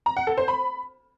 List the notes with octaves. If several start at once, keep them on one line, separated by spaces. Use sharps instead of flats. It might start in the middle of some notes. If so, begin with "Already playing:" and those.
A#5
F#5
A4
C5
B5